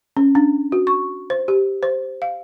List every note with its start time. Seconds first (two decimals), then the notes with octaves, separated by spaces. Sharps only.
0.17 C#4
0.35 D4
0.72 F#4
0.87 C#6
1.30 C5
1.48 G4
1.83 C5
2.22 F5